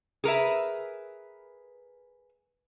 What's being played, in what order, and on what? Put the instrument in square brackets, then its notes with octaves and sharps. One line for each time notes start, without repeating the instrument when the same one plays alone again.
[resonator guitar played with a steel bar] G#4 A#4 B4 E5